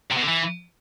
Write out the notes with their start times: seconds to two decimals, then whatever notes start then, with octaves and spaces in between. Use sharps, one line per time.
0.11 C3
0.17 B2
0.22 D3
0.28 E3